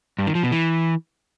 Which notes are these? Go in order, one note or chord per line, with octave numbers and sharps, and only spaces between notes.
G2
D#3
F3
B2
E3